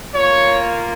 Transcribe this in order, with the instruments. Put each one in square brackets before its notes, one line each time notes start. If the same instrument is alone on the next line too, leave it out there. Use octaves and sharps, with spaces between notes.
[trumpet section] A#3 F4 C#5